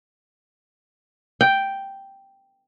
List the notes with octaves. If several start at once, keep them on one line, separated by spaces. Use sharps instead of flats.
G5